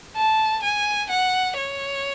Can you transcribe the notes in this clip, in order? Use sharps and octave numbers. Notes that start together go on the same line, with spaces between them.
A5
G#5
F#5
C#5